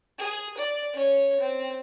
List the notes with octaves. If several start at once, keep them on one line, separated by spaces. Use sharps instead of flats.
G#4
D5
C#4 C#5
C4